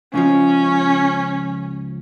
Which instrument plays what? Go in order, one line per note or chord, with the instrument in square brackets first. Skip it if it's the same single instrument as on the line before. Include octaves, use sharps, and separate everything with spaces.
[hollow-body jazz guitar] C#2 C#3 F3 [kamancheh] C#4